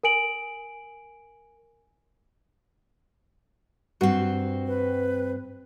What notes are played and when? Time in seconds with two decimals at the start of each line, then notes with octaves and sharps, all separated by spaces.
0.04 A#4 G#5 D7 F#7
4.01 G2 C4 F#4
4.67 B4